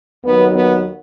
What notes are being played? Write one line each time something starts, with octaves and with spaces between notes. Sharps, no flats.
D#2 D#3 F#3 B3
B3